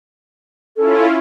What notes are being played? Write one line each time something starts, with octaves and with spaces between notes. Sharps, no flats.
C#4 E4 F4 A4